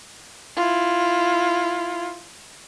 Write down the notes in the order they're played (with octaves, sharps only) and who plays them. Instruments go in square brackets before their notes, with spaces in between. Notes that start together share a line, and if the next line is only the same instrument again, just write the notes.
[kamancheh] E4 F4